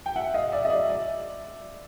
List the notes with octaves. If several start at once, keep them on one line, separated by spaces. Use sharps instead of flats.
G5
E5 F#5
D#5 F5
D5 E5
D#5
D5 E5
D5 E5